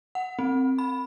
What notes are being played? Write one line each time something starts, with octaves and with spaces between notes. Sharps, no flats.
F#5
C4
B5